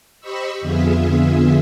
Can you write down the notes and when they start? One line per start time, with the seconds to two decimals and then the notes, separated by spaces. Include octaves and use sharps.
0.20 G4 C5 D#5 B5 C#6 E6
0.61 F2 D3 B3 F4 G#4 E5